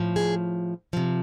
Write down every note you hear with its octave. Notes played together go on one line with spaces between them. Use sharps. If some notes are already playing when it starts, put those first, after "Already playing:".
Already playing: A2 F3
G#4
C3 F3